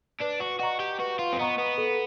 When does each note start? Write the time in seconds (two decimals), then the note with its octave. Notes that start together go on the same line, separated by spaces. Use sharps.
0.21 D4 B4
0.41 F#4
0.60 F#4 D#5 F#5 A#5 C#6
0.80 G4
0.99 F#4 B4
1.19 F4
1.33 C4
1.39 B3 D#5 F#5 A#5 C#6
1.58 B3
1.78 A4